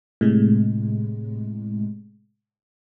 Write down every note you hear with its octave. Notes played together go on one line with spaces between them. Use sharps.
A2 C3 G#3